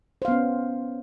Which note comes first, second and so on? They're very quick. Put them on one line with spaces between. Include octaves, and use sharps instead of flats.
C5 F5 B3 C#4